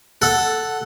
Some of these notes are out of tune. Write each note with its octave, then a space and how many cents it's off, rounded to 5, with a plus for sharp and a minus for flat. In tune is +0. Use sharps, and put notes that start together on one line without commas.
A4 +0 F#5 +5